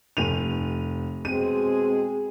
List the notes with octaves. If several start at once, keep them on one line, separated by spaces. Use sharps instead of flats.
F1 D#7 F7
B2 G#3 C4 G#4 D#7